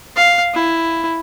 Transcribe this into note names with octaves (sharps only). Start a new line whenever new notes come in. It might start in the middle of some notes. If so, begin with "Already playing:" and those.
F5
E4